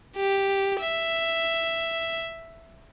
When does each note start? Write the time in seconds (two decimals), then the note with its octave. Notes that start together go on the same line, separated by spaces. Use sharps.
0.17 G4
0.81 E5